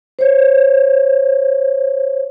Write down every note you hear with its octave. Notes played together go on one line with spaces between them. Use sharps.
C5 C#5